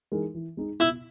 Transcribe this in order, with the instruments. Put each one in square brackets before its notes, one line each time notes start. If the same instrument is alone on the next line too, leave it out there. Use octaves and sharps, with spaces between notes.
[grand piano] E3 G#3 D#4 A#4
E3
G#3 D#4
[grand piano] B2 [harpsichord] E4